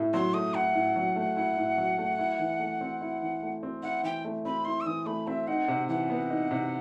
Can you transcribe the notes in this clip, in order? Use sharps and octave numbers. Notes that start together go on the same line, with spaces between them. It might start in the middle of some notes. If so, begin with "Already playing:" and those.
Already playing: A2 A3 E4
F#3 C6
A3 D#6
E4 F#5
A2
F#3
A3
E4
A2
F#3
A3
E4
E3
A3
C4
E4
E3
A3
C4
E4 F#5
E3 G5
A3
C4 B5
E4 C6
E6
E3 D#6
A3 B5
C4 E5
D#4 F#5
C3
E3 F#5
B3
D#4
C3